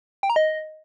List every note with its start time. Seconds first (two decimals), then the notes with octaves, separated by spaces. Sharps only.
0.23 G5
0.30 A#5
0.36 D#5